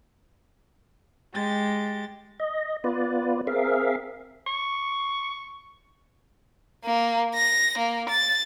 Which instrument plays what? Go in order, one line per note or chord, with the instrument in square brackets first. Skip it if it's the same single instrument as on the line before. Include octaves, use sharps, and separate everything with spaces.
[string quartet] G#3 G4 A6
[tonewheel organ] D#5
B3 F4 B4 D5
C4 G#4 A#4 E5 F5
[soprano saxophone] C#6
[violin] A#3
A#6
A#3
A6